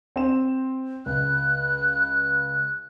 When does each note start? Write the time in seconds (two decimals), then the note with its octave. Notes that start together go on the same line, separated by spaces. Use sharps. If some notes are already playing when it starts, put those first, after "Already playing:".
0.16 C4 G5 E7
1.06 C#2 F#6